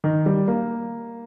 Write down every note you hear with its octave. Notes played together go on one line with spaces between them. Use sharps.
D#3
G3
A#3